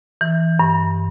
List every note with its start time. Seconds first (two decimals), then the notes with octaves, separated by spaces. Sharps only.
0.21 E3
0.59 G2